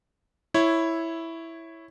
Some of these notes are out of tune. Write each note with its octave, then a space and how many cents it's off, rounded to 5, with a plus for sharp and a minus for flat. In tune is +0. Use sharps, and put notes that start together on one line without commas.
E4 +0 C#5 -5